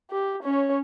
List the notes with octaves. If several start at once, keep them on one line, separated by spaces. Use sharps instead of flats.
G4
C#4 C#5